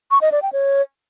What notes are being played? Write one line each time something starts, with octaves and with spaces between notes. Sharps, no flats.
C#6
D#5
D5
G5
C#5